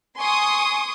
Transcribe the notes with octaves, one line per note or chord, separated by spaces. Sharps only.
G#5 C6 C#6 D#6